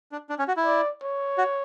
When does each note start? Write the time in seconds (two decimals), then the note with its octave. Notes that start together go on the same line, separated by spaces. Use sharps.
0.12 D4
0.30 D4
0.39 C#4
0.48 F#4
0.57 E4
0.65 D5
1.02 C#5
1.38 F#4